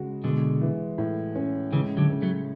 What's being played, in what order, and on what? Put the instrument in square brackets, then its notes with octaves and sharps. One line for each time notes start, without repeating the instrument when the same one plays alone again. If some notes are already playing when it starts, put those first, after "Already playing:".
Already playing: [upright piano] C#3 G#3 F#4
[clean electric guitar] B2 D3 [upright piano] G#3
[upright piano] E3
A2
C#4
[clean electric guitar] C#3 E3 [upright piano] G#3
[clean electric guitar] D3 F#3
[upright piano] C#3
[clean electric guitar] F#3 A3